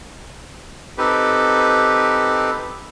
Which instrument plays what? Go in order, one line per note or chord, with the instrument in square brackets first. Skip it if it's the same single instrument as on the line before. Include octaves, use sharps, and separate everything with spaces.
[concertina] C4 D#4 G4 A4 B4